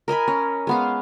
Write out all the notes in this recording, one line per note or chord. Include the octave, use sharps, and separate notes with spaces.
A#4 D#5 G#5 B5
C#4
G#3 B3 F5